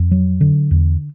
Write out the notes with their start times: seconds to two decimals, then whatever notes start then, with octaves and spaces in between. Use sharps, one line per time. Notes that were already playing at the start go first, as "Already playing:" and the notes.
Already playing: F2
0.11 F#3
0.41 D3
0.71 E2